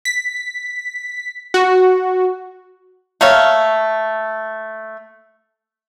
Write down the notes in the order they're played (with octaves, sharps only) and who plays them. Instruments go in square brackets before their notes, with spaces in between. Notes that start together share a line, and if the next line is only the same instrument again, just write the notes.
[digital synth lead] B6
F#4
[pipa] A3 A#3 C#5 F5